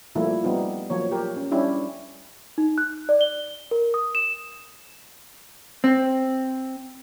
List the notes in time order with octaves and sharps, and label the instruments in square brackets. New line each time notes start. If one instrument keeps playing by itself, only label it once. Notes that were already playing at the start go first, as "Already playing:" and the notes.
[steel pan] F3 G3 A3 A#3 E4
G3 B3 C4 D#4 F4
F3 F#3 A#3 C#5
G4 A#4
C#4
G3 C#4 D4 E4 G4
[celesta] D#4
F#6
D5
G7
A#4
D#6
E7
[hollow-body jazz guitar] C4